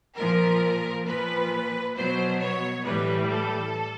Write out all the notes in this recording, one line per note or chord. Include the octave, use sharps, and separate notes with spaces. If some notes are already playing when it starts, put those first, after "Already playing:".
A#2 F3 A#4
A#2 F3 B4
B2 F#3 C5
C#5
A2 E3 G3 B4
A4